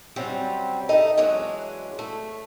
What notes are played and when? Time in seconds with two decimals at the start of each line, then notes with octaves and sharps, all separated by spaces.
0.16 C3 F#3 G3 C4 C#4
0.89 D#2 A3 D#4 A4 D#5
1.17 E3 F#3 G#3 C#4 D4
1.99 A3